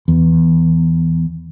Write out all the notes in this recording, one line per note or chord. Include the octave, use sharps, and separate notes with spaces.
E2